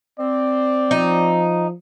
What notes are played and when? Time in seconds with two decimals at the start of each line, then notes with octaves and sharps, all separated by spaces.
0.19 C4 D5
0.91 F3 D#4